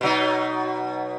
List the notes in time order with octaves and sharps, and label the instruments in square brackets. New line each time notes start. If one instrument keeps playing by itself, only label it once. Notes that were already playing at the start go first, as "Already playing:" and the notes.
[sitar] B2 F#3 D#4